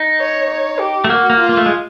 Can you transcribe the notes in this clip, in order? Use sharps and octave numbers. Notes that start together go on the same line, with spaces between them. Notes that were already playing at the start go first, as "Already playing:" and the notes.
Already playing: D#4
C#5
C#5
G4
A3
A#3 F#4
A#3
F4
A#3
A3
G#3